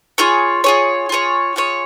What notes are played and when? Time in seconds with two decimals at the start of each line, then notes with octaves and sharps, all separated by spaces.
0.18 F4 G#4 C#5
0.64 F4 G#4 C#5
1.09 F4 G#4 C#5
1.56 F4 G#4 C#5